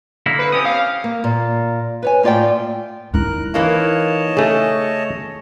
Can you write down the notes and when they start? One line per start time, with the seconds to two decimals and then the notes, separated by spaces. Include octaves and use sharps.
0.26 D3 A#3 E4
0.39 B4
0.52 C4 C#4 G4 D#6
0.66 F5
1.04 A#3
1.24 A#2
2.03 B4 C#5 G#5
2.23 A2 A#3 F4 D5 E5 G5
3.14 D#4 E4 A#4 F#6
3.54 E3 A#3 F4 C#5 D#5 A5
4.37 C#3 A3 G#4